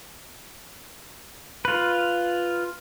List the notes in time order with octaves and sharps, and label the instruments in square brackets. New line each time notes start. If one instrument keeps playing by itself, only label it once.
[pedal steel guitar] F4 B4